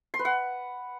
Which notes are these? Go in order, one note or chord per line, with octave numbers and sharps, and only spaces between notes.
C6
B4
F#5